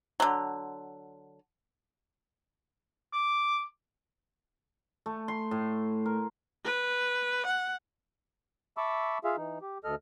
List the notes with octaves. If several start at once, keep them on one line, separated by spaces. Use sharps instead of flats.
D3 F#3
D6
A3
C6
A2
A#4
B4
F#5
E5 A5 B5 C#6 D6 E6
F4 G#4 E5 F5
E3 D#4
G4
D2 A4 D#5 F6